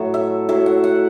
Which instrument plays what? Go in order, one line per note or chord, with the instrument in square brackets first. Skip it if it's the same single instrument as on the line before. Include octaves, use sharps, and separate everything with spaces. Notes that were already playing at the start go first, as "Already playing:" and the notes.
Already playing: [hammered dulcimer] A2 F#3 A3
E5
A2 F#3 A3 E5
F#5
F#5